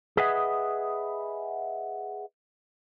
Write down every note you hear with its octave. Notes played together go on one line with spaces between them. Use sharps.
G#4 B4 D#5 E5 F#5